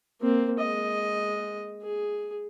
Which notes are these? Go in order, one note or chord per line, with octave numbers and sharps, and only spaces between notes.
A#3 C4
G#3 D#5
G#4